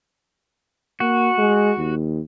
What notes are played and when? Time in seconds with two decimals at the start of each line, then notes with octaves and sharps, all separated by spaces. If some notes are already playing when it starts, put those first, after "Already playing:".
1.00 A#3 F#4
1.38 G#3
1.78 D#2